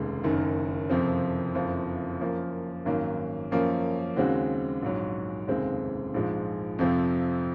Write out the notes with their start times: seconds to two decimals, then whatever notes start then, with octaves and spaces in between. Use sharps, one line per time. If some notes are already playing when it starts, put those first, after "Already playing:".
Already playing: F1 D#2 C#3 G#3
0.24 F#1 F#2 D#3
0.90 F#1 F2 C3 F3 C4
1.54 F#1 F2 C3 F3
2.20 F#2 F3 A#3 F4
2.85 G#1 F#2 D#3 F#3 A#3
3.51 F#2 F3 A#3 C#4
4.17 D#2 C#3 G#3 C4 F#4
4.82 A#1 G#2 F#3 C#4
5.48 F1 D#2 C#3 G#3 C4
6.14 A#1 G#2 F3 G#3
6.79 F2 C3 F3 C4